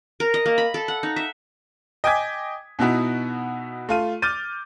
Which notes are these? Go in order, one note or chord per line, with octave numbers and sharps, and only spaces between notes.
A#4
D#5
A#3
B5
A4
F#5
D#4
E5
D#5 G5 G#5 D6 G#6 B6
B2 B3 D#4 E4 F#4
A3 F4 D#7
D6 F6 G6 A6 D#7